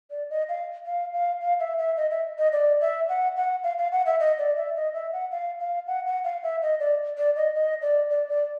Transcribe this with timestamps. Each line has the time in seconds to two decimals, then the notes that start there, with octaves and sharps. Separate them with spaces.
0.11 D5
0.30 D#5
0.49 F5
0.86 F5
1.13 F5
1.41 F5
1.60 E5
1.78 E5
1.97 D#5
2.11 E5
2.39 D#5
2.53 D5
2.81 E5
3.09 F#5
3.36 F#5
3.64 F5
3.78 F5
3.92 F#5
4.06 E5
4.20 D#5
4.39 D5
4.57 E5
4.76 D#5
4.94 E5
5.13 F#5
5.31 F5
5.60 F5
5.87 F#5
6.06 F#5
6.24 F5
6.43 E5
6.62 D#5
6.80 D5
7.18 D5
7.36 D#5
7.55 D#5
7.82 D5
8.10 D5
8.29 D5